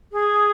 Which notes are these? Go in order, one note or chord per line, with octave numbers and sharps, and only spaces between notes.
G#4